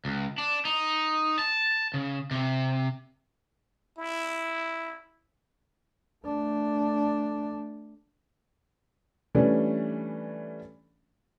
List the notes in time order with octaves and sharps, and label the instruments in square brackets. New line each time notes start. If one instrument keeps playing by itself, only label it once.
[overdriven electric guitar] C#2
D4
D#4
A5
C#3
C3
[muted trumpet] E4
[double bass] A3 D4
[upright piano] E3 G3 A3 C#4 D4